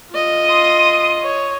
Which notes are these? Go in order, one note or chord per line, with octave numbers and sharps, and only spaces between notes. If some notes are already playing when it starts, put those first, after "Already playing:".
F4 D#5
C6 D#6
C#5